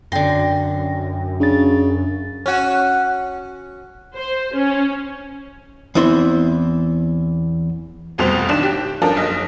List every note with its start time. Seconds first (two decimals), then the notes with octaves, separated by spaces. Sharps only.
0.12 F#2 D3 G5 C6 A#6
1.40 C#3 D4 A6
2.46 C#4 F#4
4.15 C5
4.54 C#4
5.95 E2 C4 E4 E5 C6
8.18 F1 C2 F2 B2 C5 F7
8.49 B1 D#3 D4 F#6 E7
8.63 G4
9.02 F3 C#4 D4 F4 A4 A#4
9.15 F#1 B1 D#5